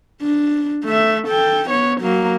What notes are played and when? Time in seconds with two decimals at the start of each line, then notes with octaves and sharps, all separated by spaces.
0.22 D4
0.85 A3 E5
1.27 A4 G5
1.70 B3 C#5
2.01 F#3 A#3